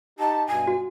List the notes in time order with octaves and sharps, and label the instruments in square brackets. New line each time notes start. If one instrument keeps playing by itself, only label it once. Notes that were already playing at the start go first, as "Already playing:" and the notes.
[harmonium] D#4 G4 [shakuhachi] A5
[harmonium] G2 B2 [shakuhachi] G#5
[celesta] F#4